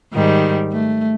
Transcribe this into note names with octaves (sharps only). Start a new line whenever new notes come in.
G#2 D#3 G3
A3